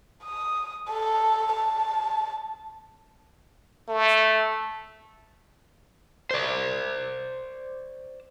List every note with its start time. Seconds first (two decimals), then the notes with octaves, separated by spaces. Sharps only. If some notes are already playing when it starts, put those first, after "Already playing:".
0.23 D#6
0.90 A4
1.53 A5
3.89 A3
6.31 C5 D5